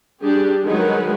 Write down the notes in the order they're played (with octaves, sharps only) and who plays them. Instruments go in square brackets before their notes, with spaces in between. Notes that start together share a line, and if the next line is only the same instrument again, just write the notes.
[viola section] G3 D4 G4 G#4
D#3 F#3 G#3 A#4 B4